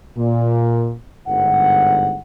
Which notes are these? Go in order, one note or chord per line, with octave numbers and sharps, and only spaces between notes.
A#2
G1 G#2 F#5